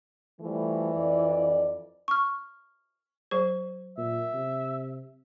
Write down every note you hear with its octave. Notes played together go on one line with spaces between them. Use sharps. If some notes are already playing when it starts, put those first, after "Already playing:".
E3 F3 G3 A3
F2 D5
C#6 F6
F#3 G#4 C5
A#2 E5
C3